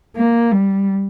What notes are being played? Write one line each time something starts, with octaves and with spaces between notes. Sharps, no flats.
A#3
G3